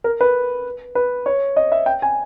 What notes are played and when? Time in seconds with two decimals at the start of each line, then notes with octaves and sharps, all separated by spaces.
0.04 A#4
0.21 B4
0.95 B4
1.26 C#5
1.57 D#5
1.72 E5
1.86 G5
2.02 G#5